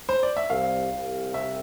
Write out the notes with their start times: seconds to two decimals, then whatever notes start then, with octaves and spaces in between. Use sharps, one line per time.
0.09 C5
0.23 D5
0.37 E5
0.50 C2 F5
0.92 C2
1.34 C3 E5